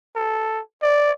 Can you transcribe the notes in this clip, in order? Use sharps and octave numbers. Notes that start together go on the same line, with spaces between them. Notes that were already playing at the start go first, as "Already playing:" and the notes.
A4
D5